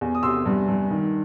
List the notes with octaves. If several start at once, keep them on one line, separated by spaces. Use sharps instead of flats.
E2
D#6
C3 C6 E6
G2
G2
D#3